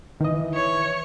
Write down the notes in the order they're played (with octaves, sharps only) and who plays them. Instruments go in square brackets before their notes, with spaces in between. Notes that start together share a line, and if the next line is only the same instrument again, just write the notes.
[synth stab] D#3 D#5 [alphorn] E3
[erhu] C#5